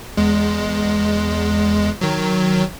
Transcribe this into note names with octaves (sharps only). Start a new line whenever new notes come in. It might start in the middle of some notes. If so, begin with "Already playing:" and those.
E2 G#3
D#3 F#3